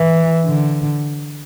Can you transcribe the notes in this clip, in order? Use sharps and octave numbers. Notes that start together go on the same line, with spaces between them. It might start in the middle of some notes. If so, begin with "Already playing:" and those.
Already playing: E3
D3